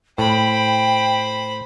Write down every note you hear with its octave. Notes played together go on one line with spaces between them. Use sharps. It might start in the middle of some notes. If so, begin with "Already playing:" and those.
A2 C5 G5 B5